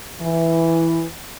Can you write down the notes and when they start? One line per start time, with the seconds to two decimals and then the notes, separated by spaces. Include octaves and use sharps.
0.21 E3